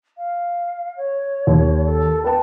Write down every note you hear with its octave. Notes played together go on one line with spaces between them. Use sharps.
F5
C#5
D#2
A4
B4 G5 A5